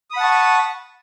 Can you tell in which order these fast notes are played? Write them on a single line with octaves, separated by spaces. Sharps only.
D#6 B5 F#5 A5 C#6